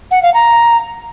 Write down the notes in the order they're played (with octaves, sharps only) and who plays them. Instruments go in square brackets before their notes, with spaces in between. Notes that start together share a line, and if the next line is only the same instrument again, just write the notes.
[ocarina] F#5
F5
A#5